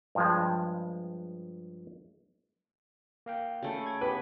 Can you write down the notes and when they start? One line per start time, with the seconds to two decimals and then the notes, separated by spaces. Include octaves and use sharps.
0.15 G2 F3 G#3
3.26 A#3 F5 G5
3.63 C#3 A3
3.87 G#6
4.01 B3 G4 B4